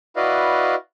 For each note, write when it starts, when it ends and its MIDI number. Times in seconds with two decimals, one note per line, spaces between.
0.16 0.75 64
0.16 0.75 66
0.16 0.75 71
0.16 0.75 74
0.16 0.75 75
0.16 0.75 77